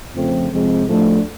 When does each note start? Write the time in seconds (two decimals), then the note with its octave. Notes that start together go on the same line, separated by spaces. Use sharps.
0.13 F2 C#3 F3 A3 C4
0.49 F2 C3 F3 G#3 C4
0.85 A2 F3 A3 D4